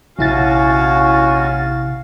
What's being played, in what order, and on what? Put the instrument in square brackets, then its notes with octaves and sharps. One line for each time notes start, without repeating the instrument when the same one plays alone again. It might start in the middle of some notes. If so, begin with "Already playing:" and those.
[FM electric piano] A#1 E4 A6 [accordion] D#2 C#4 F#4 [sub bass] C3 [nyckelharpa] F5